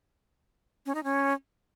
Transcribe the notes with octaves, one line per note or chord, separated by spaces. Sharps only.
C#4
D#4
C#4